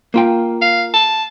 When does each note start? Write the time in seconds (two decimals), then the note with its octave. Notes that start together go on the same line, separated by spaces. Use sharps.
0.14 A#3 F4 G5
0.62 F5
0.94 A5